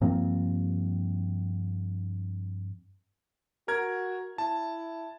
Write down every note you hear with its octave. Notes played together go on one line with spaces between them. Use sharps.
G2 F3 A#3 C4
F#4 A#4 G#6
E4 A5